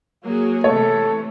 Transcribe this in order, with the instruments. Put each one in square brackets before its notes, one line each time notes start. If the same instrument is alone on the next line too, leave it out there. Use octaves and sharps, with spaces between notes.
[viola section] F#3 G#4 [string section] A#3
[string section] C3 E3 [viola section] A3 [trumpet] A4 [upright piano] C#5